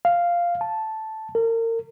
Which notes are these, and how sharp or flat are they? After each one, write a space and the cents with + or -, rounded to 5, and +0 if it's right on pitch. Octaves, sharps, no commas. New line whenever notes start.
F5 -5
A5 -5
A#4 -35